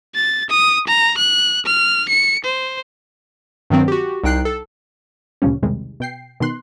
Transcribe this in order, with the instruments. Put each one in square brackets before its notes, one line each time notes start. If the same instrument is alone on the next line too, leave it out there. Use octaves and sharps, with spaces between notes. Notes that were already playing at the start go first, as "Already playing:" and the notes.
[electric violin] A6
D#6
A#5
F#6
F6
C#7
C5
[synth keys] G2 D#3 F#3 C4
F#4 G4
C2 D#4 G5 F#6 C7
A4
[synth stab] D2 A#2 C#3 F3 G3 C#4
B1 E2 C3 D#3 G3 G#3
B2 G5 C7
B2 D#3 C6 F#6